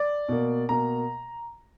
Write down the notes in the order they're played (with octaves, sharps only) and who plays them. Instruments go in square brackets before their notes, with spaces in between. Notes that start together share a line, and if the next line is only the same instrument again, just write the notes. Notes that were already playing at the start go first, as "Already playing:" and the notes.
Already playing: [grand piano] D5
B2 A#3
B2 A#3 A#5